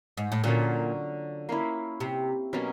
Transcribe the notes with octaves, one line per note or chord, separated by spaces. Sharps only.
G#2
A2
A#2 D3 F#3 A#3 C#4
A#3 C#4 E4
C3
B2 F#3 A#3 C#4